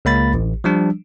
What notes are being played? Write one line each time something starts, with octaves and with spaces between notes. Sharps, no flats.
C#2 A#3 B5 A6
A1
F3 G3 D4